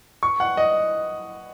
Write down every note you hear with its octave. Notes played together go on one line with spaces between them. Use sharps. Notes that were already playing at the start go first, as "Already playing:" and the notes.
C#6
F#5
D#5